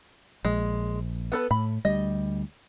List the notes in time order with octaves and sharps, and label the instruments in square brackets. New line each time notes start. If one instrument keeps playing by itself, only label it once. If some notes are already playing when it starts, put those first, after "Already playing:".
[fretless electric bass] A#1 [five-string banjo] G#3
[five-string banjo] B3 A4 B4
[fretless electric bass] A2 [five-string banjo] B5
[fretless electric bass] D2 G3 [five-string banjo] D#5